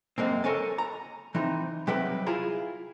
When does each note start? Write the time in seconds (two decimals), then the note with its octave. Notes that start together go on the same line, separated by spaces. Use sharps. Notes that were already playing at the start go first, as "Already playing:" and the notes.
0.18 F#2 G#3 A#3 C4
0.44 A4 A#4 C#5 G#5 A5
0.78 A#5
1.35 E3 C4 D#4
1.87 C3 F#3 G3 B4 G5
2.26 E4 F4 G#4 A#5